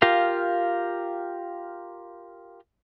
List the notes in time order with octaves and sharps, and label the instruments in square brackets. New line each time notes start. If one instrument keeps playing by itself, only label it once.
[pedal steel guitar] F4 G4 A#4 F5